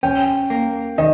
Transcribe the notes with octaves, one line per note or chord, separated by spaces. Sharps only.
C#4 G5
A#3
D#3 D#5